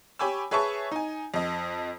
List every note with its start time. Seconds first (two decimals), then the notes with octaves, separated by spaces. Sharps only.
0.19 G4 C#5 G#5 B5 D6 E6
0.51 G#4 B4 C#5 E5 A5 C#6
0.91 D#4 G#5
1.34 F2 D#5